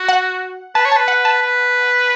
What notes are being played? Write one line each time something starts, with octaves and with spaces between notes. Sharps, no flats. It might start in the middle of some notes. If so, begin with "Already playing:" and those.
Already playing: F#4
F#5
B4 A5
C#5
B4 A5
F#5
A5
B4